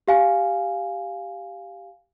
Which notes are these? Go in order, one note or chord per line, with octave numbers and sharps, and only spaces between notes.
G4 F5 G#5